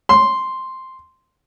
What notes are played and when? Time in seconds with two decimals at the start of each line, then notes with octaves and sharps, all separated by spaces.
0.09 C6